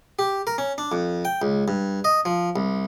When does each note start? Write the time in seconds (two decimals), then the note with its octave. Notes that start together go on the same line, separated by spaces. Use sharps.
0.19 G4
0.47 A#4
0.58 C#4
0.78 D4
0.92 F2
1.25 G5
1.42 C#2
1.68 G2
2.04 D#5
2.25 F3
2.56 C2